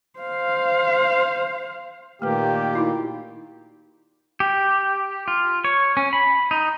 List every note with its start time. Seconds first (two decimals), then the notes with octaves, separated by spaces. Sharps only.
0.20 C5 F5
2.22 A#2 D#3 A3 A#3 G4 B4
2.73 D#4 E4 F#4
4.40 G4
5.28 F4
5.65 C#5
5.97 C#4
6.13 B5
6.51 D#4